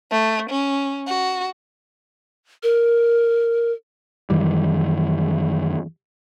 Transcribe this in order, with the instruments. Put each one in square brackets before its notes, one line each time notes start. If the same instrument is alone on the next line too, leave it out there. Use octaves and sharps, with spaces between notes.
[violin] A3
C#4
F#4
[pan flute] A#4
[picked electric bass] F#2 D#3 E3 G3